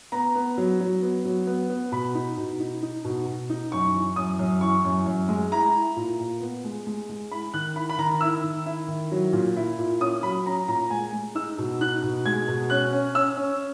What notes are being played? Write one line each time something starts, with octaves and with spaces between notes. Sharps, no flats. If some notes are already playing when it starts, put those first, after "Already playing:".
B3 A#5
B3
F#3
F#3
B3
F#3
B3
B3
B2 B5
D#4
B2
D#4
D#4
B2
B2
D#4
F#2 C#6
E3
F#2 D#6
F#2
E3 C#6
F#2
F#2
G#3
E4 A#5
E4
A#2
A#2
B3
G#3
G#3
G#3
E4 B5
D#3 F#6
E4 B5
B5
D#3 A#5
E4 E6
D#3
E4
D#3
F#3
A#2
E4
A#2
C#4 D#6
F#3 B5
C#4 A#5
A#2 A#5
G#3 G#5
G#3
D#4 E6
B2
D#4 F#6
B2
G#3 G#6
B2
C#4 F#6
C#4
C#4 E6
C#4